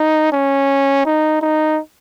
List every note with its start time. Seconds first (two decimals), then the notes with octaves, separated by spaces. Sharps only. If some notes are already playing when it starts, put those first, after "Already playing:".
Already playing: D#4
0.32 C#4
1.05 D#4
1.42 D#4